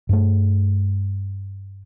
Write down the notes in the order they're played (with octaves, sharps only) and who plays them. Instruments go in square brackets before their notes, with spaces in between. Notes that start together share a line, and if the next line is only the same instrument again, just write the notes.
[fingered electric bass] G2 A3